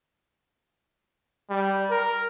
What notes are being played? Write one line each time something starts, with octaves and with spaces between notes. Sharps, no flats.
G3
A#4